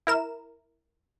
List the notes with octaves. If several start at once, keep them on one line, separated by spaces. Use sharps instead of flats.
E4 A#4 E7